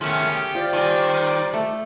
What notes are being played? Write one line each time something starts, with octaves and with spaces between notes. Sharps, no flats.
D#3 F3 A3 B3 C#4 G#4 E5
G4
F4 C5 D5
D#3 G3 G#5 C6
A3